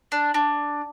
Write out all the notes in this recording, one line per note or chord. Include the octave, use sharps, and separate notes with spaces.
D4
D4